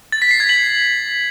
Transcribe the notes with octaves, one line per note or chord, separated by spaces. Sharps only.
A6
B6
C7
G#6
F#7